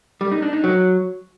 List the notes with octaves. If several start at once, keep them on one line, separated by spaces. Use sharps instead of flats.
G3
D#4
D4
D#4
F#3